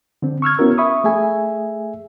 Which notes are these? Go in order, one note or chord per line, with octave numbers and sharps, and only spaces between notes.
D3 C4
C#6 E6 F6 G#6
B3 C#4 E4 F#4 A#4
E5 B5 C#6 D#6
A3 G#4 E5 G#5